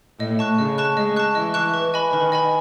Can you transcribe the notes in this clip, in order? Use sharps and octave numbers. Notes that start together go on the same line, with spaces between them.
A2 D#5
A5 C#6 F#6
C#3 D#5
A5 C#6 F#6
G#3 D#5
A5 C#6 F#6
E3 D#5
A5 C#6 F#6
B4
D#5 G#5 B5
D#3 B4
D#5 G#5 B5